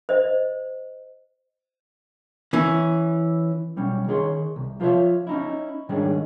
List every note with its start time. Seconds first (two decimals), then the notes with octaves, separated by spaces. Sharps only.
0.09 C5 D#5
2.53 E3 C#4
3.76 B1 G3 C#4
4.08 D#3 G#4 C#5 C6
4.56 C2
4.80 F3 F4 A#4 B4 C#5 E5
5.27 C#4 D#4 E4
5.89 G#2 D#3 G3 G#3 C#4 D4